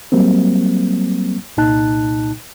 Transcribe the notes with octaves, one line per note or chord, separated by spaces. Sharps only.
F#3 G3 A#3 C4
C2 A#2 D#4 A5 F#6